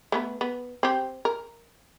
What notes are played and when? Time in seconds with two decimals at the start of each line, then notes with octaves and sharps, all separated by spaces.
0.12 A3 B3 B4
0.41 B3
0.83 C4 G4
1.25 A#4